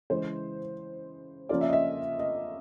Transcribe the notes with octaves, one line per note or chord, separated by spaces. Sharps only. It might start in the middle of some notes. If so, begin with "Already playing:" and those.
C#3 E3 G#3 C5
C#3 F3 A#3 C#4 F4 D5
E5
D#5
E5
D#5